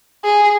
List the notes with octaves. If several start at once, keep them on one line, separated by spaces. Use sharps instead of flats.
G#4